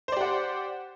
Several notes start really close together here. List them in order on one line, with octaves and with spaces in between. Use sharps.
C5 D5 G4 F#5